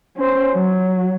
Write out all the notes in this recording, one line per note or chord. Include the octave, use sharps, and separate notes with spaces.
C#4 C5
F#3